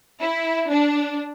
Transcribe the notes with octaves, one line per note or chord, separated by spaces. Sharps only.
E4
D4